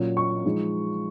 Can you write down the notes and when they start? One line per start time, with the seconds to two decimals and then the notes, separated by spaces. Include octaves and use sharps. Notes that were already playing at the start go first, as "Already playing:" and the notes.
Already playing: A#2 F#3 C#4
0.17 C#6
0.44 F3 G#3 D#4